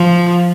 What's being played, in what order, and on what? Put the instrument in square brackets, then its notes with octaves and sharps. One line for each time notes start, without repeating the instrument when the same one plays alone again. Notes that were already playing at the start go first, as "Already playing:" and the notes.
Already playing: [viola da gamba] F3